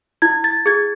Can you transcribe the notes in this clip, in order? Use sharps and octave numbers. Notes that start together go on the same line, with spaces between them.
E4 G#6
A6
G#4 G#6